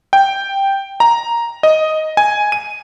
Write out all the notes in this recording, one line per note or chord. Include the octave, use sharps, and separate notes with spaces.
G5
A#5
D#5
G#5
D#7